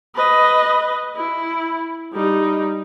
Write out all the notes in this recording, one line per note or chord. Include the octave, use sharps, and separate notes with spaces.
B4 D#5
E4
G3 D#4